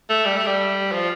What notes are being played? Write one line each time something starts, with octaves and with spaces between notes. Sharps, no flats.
A3
G3
A3
G3
F3